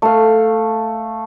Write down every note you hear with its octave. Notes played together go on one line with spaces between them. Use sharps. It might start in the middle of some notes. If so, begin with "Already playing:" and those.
A3 F5